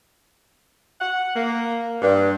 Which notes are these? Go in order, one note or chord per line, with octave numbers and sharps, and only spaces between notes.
F#5
A#3
G2